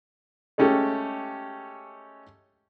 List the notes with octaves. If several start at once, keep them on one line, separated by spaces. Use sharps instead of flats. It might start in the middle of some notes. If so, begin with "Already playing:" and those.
G#3 A3 C#4 G4 A4